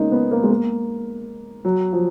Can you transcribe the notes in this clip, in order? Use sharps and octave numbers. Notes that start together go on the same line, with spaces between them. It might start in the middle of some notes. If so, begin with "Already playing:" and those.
Already playing: G#3 A#3 C#4 D#4
B3
A#3
G#3
A#3
F#3
F3